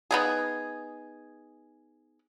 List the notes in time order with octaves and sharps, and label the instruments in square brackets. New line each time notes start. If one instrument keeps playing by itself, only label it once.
[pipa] B3 D#4 G#4